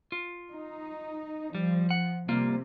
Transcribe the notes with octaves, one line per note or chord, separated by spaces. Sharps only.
F4
D#4
F3 G3
F#5
C3 G3 A#3 F4